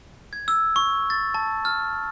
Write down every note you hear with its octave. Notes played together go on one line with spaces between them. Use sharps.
G#6
E6
C#6
A6
A5
F6